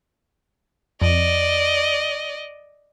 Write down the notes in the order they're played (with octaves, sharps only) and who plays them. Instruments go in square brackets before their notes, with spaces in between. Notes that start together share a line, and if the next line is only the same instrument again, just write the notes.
[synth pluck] F2 [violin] D5 D#5